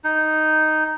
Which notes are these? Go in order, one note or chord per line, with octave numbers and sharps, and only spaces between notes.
D#4